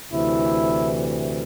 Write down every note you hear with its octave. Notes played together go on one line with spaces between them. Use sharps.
D2 C3 E3 E4